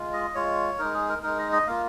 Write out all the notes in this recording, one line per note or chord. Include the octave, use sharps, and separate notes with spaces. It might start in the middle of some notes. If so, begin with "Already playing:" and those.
Already playing: G#3 F4
D#5
G#3 F4 C#5
G#3 D#4 A#4
G#4
A#4
G#3 D#4 A#4
D#5
D#5
A#3 F4 F5